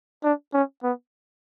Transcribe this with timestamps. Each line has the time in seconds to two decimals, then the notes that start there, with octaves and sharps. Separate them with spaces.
0.24 D4
0.54 C#4
0.83 B3